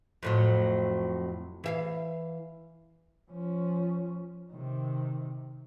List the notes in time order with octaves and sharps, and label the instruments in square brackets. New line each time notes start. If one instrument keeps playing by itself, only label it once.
[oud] F2 A2 F#3
E3 E5 F5
[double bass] F3 C#4
C3 D#3